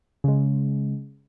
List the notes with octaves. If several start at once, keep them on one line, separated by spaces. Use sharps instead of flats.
C#3 G#3